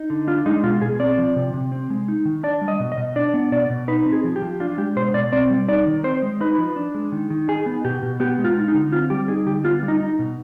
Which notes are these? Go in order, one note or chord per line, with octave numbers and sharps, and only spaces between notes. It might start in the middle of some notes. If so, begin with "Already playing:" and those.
Already playing: D#4
D3
D4 F4
G#3 D#4
B2 F4
B2 G#4
C4 D5
F3
C3
C3
C4
G#3
D#4
D#3
D4 D5
G3
D#5
B2
D#5
B2
D4 D5
B3
B2 D5
B2
D#4 B4
C4
G#4
F3
G4
F3
D4 F4
G#3 G4
B2 C5
B2 D5
C4 D5
G3
D#4 D5
D#3
C4 C5
G#3
D#4 B4
F3
D4
G#3
D#3
D#3
D#4 G#4
B3
B2 G4
B2
B3 G4
G#3
F4
D#4
D#4
D3
C4 F4
G3 G4
D#4 G#4
D3 G4
B3 F4
G3
D#4
D#4
B2